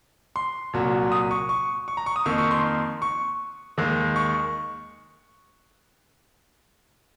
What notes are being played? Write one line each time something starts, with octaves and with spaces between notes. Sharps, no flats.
C6
C2 A#2 F#3
D#6
C#6
C#6
C#6
A#5
C#6
D#6
F2 D#3 A#3 C#6
C#6
C6
C#6
D#2 D#3 G#3
C#6